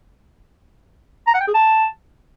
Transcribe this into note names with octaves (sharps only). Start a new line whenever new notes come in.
A#5
F#5
G5
G#4
A5